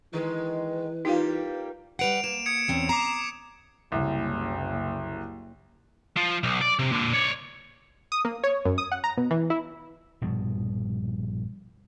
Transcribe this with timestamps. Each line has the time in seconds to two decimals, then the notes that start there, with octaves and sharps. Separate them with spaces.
0.13 D#3 E3 G#3 B4
1.05 G3 A#3 D#4 F4 G4 F5
1.99 G3 B4 F#5 C7 D7 F7
2.24 A#3 E7
2.46 D#6 G#6 C#7
2.68 E2 C4 C#4
2.89 A#5 D6 C7 E7
3.92 F#1 C2
6.17 F3
6.43 B1
6.61 D5
6.79 C3
6.92 A#2 D3
7.14 C#5 D5
8.12 D#6
8.25 A#3
8.44 C#5
8.65 F#2
8.78 D#6
8.92 F#5
9.04 A#5
9.17 B2
9.31 E3
9.50 E4
10.21 A#1 G2 B2 F3